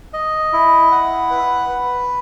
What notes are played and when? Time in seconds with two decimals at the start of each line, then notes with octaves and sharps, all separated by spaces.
0.13 D#5
0.53 E4
0.91 F#5
1.30 B4
1.69 B4